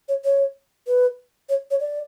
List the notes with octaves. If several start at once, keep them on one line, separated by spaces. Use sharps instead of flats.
C#5
C#5
B4
C#5
C#5
D5